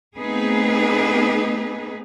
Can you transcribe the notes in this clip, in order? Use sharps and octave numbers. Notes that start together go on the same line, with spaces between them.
A3 B3 C4 D#4 G#4 B4